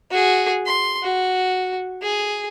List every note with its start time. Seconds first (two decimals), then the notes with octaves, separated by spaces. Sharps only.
0.11 F#4 G#4
0.66 C6
1.02 F#4
2.02 G#4